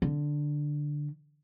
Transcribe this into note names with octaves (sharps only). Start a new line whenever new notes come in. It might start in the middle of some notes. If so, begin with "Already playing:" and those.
D3